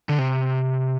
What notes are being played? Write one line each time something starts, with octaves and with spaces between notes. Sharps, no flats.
D3
C3